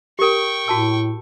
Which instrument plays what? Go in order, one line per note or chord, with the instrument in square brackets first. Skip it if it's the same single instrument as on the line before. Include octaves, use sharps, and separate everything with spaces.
[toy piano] G4 A#4 [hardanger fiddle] G5 C#6
[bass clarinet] A2 [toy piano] F#4 A5 E6